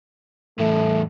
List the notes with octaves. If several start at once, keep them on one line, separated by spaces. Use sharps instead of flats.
E2 A2 A3